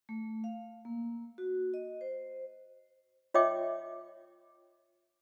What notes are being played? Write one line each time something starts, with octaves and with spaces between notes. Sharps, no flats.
A3
F5
A#3
F#4
D#5
C5
F4 C#5 D#5 E5 G5 D6